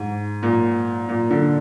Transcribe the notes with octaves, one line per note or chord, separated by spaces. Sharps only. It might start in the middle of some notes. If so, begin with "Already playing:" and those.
Already playing: G#2
A#2
A#2
D3